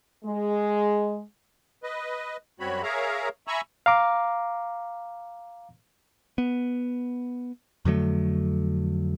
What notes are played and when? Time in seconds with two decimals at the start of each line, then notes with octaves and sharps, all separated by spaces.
0.24 G#3
1.83 B4 D#5
2.60 F#2 G3 C4 F#4 C#5 B5
2.83 G#4 A#4 C#5 E5 F5 A#5
3.47 E5 G#5 A#5 B5 C#6 E6
3.86 F5 A#5 D6
6.38 B3
7.85 F2 D3 F#3 A3